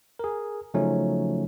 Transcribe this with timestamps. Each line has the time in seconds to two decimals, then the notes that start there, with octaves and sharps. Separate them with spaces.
0.19 G#4 A#4
0.74 C#3 F3 F#3 A3 C#4 D#4